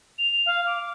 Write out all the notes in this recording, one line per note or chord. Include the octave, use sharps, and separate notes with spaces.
F7
F5
D6